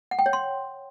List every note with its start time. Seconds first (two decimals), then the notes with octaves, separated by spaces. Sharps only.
0.11 F#5
0.19 G5
0.26 C#5
0.33 C6